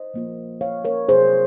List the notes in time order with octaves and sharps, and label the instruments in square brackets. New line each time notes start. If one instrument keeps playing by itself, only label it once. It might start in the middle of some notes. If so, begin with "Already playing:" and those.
Already playing: [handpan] C5 D#5
F3 A#3 F4
C#5 F5
A#4 C#5
C3 F#3 C4 F4 G#4 C5